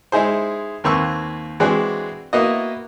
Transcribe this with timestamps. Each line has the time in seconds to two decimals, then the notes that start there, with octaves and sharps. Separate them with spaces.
0.12 G#3 D#4 E4 G#4 C5
0.84 D#2 A#3 C4 B4 C#6 E6
1.60 E3 G#3 C4 D4 F#4 G#4
2.33 A#3 B3 E4 F#4 D#5